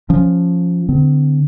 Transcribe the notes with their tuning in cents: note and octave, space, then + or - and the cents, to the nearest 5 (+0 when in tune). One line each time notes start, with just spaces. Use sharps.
F3 +0 C#4 +0
D3 +0 C4 -45